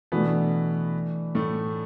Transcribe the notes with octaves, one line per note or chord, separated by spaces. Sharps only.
B2 E3 A3 B3 D4
A2 A3